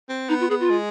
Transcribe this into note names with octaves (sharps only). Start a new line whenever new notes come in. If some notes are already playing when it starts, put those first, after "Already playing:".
C4
B3 D#4
F4
B3 G#4
F4
G#3